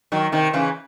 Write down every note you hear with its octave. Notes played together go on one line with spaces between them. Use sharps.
D#3 F#3
C3 D#3
C#3 E3